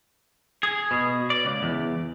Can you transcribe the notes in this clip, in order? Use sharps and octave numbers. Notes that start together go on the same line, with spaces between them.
G#4
B2
D5
C#2
E2